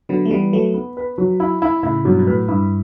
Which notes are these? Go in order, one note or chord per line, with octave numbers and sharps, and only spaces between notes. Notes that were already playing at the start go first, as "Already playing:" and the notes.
D3 F#3 B3
A3
E3 G3 B3
F#3 A3 B4
B3
B4
F#3
E4
E4
A2 C#3 E4
G2 B2 F#3
B2
A2 B4
G2 E4